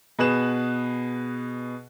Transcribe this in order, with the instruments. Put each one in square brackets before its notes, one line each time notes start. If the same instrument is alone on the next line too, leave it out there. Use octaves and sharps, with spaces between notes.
[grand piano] B2 G#4 B4 F#6 E7